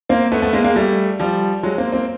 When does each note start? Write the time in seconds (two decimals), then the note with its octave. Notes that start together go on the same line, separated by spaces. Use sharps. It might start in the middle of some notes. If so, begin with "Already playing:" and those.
0.09 A#3 C4
0.32 A3 B3
0.42 A3 B3
0.53 G#3 A#3
0.64 G#3 A#3
0.76 G3 A3
1.20 F3 G3
1.63 F#3 G#3
1.78 A#3 C4
1.92 A#3 C4